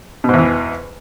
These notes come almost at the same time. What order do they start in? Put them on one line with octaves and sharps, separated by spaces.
B2 G#2 E2 E3